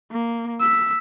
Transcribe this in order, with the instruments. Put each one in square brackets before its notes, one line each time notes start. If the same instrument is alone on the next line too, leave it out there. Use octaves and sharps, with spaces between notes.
[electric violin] A#3
E6 B6